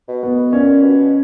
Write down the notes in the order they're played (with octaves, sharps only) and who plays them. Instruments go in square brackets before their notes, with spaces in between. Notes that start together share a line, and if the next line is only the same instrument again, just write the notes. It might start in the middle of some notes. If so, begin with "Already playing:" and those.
[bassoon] B2
[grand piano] B3
[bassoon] A#2 [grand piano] C#4
[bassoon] B2